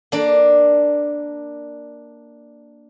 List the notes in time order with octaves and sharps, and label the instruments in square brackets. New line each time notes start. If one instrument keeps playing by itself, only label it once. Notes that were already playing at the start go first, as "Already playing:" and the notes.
[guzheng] A#3 D4